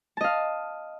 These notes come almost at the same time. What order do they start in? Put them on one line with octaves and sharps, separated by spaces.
A5 D#5 F5